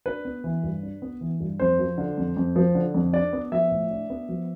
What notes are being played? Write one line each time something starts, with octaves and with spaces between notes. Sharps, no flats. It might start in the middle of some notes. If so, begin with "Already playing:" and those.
D4 B4
B3
E3
G2
D4
B3
E3
G2
F2 C5
F3
D3
F2
F2
F3
D3
F2
D4 D5
B3
F3 E5
A2
D4
B3
F3